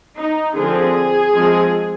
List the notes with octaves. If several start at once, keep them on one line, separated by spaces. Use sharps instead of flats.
D#4
D3 F3 C4 G#4
F3 G#3 C4